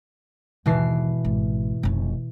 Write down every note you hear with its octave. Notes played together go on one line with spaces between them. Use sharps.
G#1 D#2 B2 E3 C7
G#1
F1 C#4